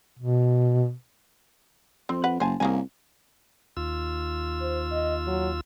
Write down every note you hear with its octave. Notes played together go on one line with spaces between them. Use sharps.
B2
F2 C4
B4 F#5
F#1 C5 G#5 A5
C2 C#3 A#3 G#5
D#2 F4 E6
C5
D#5
F#3